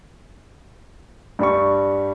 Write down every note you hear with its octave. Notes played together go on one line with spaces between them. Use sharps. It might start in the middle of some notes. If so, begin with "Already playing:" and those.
G2 G3 C#6